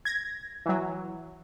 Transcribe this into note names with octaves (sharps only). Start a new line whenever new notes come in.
G#6 A#6
E3 F#3